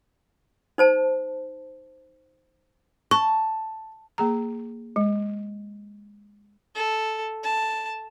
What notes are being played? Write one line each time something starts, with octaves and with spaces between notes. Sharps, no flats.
D#4 C5 A5
A5 C#6
A#3 G#4 A#5
G#3
A4
A5